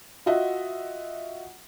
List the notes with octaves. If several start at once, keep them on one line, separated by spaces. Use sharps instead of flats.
F4 F#4 D#5 E5 F#5